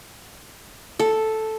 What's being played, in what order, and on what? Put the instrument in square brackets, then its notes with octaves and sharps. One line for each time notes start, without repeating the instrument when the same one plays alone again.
[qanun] A4